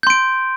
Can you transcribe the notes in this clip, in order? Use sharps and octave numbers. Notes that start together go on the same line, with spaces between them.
C6 G6 D7